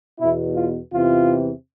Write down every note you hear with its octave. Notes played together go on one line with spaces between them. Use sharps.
E2 B2 E4
F4
E2 C3 E3 F4